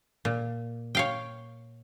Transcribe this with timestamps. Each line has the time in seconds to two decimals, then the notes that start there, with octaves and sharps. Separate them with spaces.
0.25 A#2
0.95 C#5 F5 G5